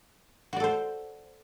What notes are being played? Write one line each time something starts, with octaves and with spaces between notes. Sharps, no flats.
F#4 A4 C5 D5